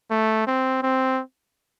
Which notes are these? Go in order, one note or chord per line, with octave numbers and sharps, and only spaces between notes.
A3
C4
C4